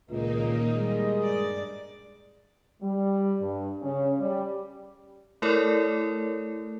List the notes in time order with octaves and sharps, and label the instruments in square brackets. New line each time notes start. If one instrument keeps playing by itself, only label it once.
[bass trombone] C#2 [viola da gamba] A#2 [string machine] D#3 A#3 D#4 [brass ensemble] A#4 D#5
[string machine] G3 [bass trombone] G#3
[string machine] G2 [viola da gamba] D5
[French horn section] G3
G2
C#3
G3
[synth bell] A3 E4 A4 A#4 C#5 D5